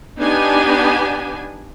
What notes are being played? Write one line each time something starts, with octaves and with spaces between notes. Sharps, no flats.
B3 D4 D#4 G4 G#5